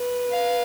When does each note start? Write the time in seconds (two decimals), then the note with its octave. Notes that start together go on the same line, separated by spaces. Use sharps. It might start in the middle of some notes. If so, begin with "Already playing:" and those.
Already playing: B4
0.32 F5